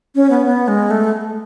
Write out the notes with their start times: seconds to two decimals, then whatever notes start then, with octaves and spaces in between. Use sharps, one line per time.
0.15 C#4
0.30 B3
0.46 B3
0.68 G#3
0.91 A3